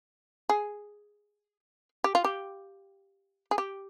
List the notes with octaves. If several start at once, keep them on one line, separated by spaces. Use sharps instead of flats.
G#4
G4
F4
G4
G#4
G4